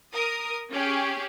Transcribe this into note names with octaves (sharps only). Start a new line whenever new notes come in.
A#4 D#6
C#4 G4 G#4